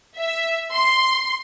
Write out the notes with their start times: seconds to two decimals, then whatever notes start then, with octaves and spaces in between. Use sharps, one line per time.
0.16 E5
0.74 C6